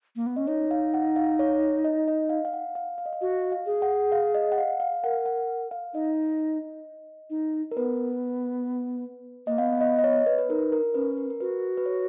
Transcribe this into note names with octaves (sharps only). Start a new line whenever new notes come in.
A#3
B3
C#4 D#5
D#4 C#5
F5
F#5
F5
C#5
D#5
D#5
F5
F5
F#5
F5
F5
D#5
F5
F#4 D#5
F5
G#4
F#5
F5
D#5
F#5
F5
F5
A#4 F#5
F#5
F5
D#4 D#5
D#4
A#4
B3 B4
A#3 D#5
B3 F5
D#5
D#5
C#5
B4
B4
D#4 A#4
A#4
C#4 B4
A#4
A#4
F#4 B4
B4
C#5